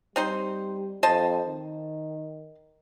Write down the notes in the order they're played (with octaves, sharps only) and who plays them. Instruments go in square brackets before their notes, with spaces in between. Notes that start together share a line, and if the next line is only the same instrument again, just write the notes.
[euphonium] G3 [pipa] C4 D#4 C5
[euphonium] F2 [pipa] C5 D#5 A5
[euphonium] D#3